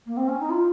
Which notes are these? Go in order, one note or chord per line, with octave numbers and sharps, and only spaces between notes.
A#3
C4
C#4
D#4
F4